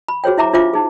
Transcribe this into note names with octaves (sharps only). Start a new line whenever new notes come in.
B5
F#4 G#4 C5 C#5 G5
E4 E5 A#5 D6
D4 F4 C5 E5 F5 D6
D#4 G#4